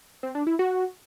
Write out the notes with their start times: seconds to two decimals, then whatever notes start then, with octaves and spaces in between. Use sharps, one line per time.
0.23 C4
0.35 D4
0.47 E4
0.59 F#4